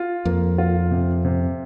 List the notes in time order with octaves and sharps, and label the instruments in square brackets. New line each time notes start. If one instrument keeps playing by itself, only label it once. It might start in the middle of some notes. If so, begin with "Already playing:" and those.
Already playing: [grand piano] F4
[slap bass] F2 [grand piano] A#3
[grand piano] F4
C3
C3